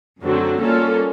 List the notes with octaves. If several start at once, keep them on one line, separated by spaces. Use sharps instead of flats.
F#2 D3 F#3 A3 C4
G3 A#3 C#4 F4 A4